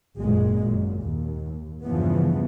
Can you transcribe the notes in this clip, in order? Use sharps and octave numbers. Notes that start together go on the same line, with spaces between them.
G#1 F#2 A#2 G#3
F#2 A#2
D#2
E2 G2 C#3 E3 F3 B3